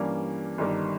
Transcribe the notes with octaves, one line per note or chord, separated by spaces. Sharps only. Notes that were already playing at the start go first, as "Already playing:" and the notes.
Already playing: G2 E3 G3 A#3 C#4
G1 G2 D#3 G3